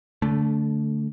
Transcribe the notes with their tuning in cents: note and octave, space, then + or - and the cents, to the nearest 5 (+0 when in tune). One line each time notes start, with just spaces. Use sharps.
D3 -25 A3 +0